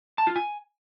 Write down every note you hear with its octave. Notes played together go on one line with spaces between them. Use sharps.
A5
F4
G#5